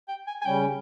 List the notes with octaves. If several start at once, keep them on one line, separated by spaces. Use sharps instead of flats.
G5
G#5
G#5
C#3 G3 C#4 G5